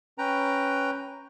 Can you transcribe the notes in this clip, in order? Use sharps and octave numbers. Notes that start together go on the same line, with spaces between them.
C#4 B4 G5 A#5